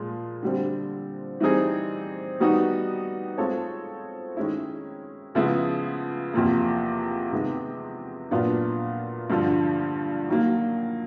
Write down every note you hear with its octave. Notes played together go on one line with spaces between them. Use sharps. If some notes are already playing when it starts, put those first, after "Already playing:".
Already playing: A#2 F3 G#3
D3 G3 C4
E3 G3 C4 D#4 G#4
D#3 G3 B3 D#4 F#4
G#3 C4 F4 A4 C#5
D#3 G#3 C#4 E4
C#3 F3 G#3 B3 E4
E2 C3 F3 A#3
C3 D#3 G#3 B3
A#2 F#3 B3 D4 F4
G2 D3 F3
D#3 F#3 A#3